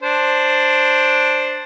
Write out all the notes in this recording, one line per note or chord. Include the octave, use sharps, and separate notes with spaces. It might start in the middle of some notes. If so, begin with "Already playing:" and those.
D4 C5